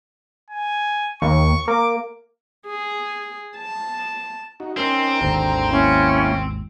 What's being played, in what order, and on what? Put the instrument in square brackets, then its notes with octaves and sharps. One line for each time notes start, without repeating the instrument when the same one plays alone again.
[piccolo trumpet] G#5
[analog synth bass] D#2 [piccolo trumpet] C#6
[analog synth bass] A#3 [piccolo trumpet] D6
[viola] G#4
A5
[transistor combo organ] D#4 F#4
[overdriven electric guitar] C4 [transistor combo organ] C#4 D#4 A#4
[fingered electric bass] G#1 D#2 [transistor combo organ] D3 C5 A#5
[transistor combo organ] A#3 E4 [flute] C#4